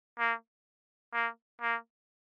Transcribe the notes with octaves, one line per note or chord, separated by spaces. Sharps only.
A#3
A#3
A#3